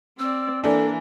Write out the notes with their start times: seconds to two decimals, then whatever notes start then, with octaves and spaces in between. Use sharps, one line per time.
0.19 C4 D5 E6
0.64 E3 A#3 D4 A4